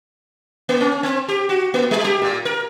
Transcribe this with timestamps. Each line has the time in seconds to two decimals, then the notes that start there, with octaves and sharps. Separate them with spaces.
0.69 A#3
0.81 C#4
1.03 C4
1.28 G4
1.49 F#4
1.74 A#3
1.91 G3
2.04 G4
2.22 A#2
2.45 A#4